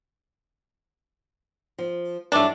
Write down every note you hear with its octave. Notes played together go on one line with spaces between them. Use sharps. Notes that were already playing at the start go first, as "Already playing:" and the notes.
F3
G2 E3 F#3 A3 D4